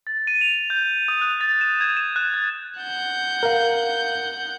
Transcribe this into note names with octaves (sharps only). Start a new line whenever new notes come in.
A6
D#7
F7
G6
D#6
F#6
A6
E7
G#6
E7
F#6
A6
F#5 G6
A#4 F5